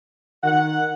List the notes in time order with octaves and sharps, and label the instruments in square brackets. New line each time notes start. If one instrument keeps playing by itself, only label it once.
[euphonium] D#3 [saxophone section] F#5